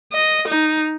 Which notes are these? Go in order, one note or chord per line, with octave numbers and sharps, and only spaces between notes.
D#5
D#4